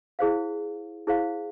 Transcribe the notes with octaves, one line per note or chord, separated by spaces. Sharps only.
E4 G#4 C5 F5
E4 G#4 C5 F5